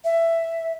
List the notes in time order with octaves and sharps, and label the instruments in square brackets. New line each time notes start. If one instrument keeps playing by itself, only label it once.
[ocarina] E5